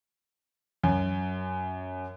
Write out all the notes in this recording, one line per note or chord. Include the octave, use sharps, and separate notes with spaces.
F#2